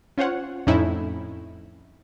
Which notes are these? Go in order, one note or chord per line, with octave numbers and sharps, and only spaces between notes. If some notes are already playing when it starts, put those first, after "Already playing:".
C#4 F4 C5 C#5 F#5
F2 A2 C#4 D#4 E4